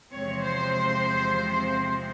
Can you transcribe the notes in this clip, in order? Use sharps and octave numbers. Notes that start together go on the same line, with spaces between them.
E2 C3 F3 G#3 C4 C#5
C5